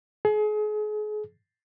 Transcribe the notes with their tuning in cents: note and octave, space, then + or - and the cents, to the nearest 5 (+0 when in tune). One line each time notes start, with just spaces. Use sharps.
G#4 +35